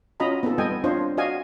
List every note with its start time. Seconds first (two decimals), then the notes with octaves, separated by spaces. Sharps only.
0.20 C#4 F4 F#4 D#5 A#5 B5
0.43 B3 C4 D#4 F4 A4
0.58 G3 B3 D#5 G5 G#5
0.84 C4 D4 F4 C5 C#5 D#5
1.17 F#4 D5 D#5 F5 G#5